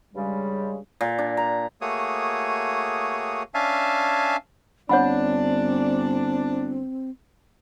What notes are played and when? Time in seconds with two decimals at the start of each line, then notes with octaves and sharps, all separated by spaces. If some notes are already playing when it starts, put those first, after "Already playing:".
0.14 G2 C#3 G3 G#3
1.01 A#2
1.18 D4
1.37 A#5
1.81 A3 A#3 F#4 G#4 C#5 D#6
3.54 C#4 D4 E5 F5 G#5 A5
4.89 G1 C4 D4 C#5 F#5 B5